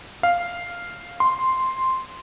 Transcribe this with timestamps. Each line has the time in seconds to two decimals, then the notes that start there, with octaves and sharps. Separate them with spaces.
0.23 F5
1.20 C6